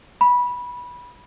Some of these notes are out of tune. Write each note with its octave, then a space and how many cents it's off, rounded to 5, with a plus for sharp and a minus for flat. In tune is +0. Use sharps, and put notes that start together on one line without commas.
B5 -15